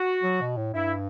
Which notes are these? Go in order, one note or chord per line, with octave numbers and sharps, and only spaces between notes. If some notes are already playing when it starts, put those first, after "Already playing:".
Already playing: F#4
F#3
B2
A2
G2 E4